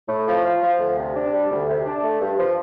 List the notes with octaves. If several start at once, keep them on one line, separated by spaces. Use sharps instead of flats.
A2
F3
F4
F3
D2
C3
D4
G3
D2
C3
D4
A3
G2
F3